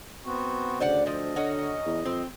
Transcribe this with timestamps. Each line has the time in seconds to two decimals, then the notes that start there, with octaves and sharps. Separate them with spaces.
0.25 B3 C4 F#4
0.80 D2 C#3 C5 D5 F#5
1.06 F3 C4 D#5
1.36 D3 C#4 D#4 F#4
1.86 E2
2.05 F2 C4